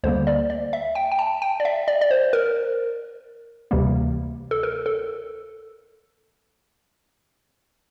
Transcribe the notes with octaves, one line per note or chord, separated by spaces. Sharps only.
D2 D3 G3 A#3 C5
D5
D5
E5
G5
G5
A5
G5
D5
E5
D5
D5
C5
A#4
D2 C3 E3 G3 A#3
A4
A#4
A4